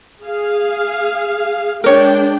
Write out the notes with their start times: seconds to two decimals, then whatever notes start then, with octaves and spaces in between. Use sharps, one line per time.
0.24 G#4 F5
1.84 G#3 D4 A#4 C#5 G5